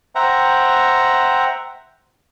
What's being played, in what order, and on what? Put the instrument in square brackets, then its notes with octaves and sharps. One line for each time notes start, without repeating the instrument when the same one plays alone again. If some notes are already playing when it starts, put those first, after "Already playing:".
[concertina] C5 E5 F#5 G5 A#5